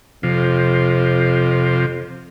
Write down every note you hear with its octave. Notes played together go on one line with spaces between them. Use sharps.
F2 C3 F3